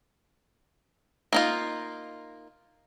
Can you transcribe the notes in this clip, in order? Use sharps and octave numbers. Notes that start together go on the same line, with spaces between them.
A#3 D#4 F4